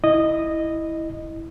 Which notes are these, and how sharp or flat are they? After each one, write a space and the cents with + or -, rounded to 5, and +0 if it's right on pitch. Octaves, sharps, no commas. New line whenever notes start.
E4 -10 D#5 -10